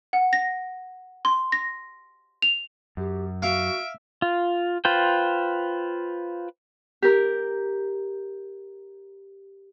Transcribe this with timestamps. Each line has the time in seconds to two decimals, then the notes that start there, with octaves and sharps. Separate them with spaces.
0.13 F#5
0.33 A#6
1.25 C6
1.52 A#6
2.42 F7
2.97 F#2 G4
3.42 F#4 E5 F5 D7
4.22 F4
4.85 F4 B4 C5 G5
7.02 G4 A#4